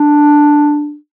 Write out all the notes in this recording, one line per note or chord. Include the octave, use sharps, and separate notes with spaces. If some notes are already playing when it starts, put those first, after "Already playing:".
Already playing: D4